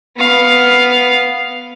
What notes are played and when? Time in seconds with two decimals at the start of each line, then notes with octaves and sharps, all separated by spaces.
0.17 B3 F5